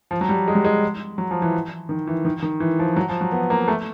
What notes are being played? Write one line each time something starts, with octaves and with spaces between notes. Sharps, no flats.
F3
F#3
G3
G#3
G3
G#3
F#3
F3
E3
D#3
E3
D#3
D#3
E3
F3
F#3
F3
F#3
B3
A#3
A3